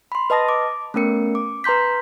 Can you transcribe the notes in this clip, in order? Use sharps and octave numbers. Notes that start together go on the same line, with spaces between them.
B5 C6
B4 D#5 A5 D#6 A#6
D6
A3 B3 C#4 A#4 C#7
D6
B4 A#5 C6 G6 B6